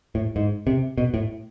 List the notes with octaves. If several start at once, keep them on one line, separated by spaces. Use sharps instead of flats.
A2
G#2
C3
B2
A2